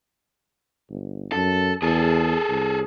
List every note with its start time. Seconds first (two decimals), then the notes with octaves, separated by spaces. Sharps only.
0.90 G1
1.32 F#2 A4
1.82 E2 G#4 A4
2.49 C2